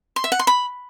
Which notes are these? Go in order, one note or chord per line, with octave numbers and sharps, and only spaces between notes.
C6
E5
F#5
C6
B5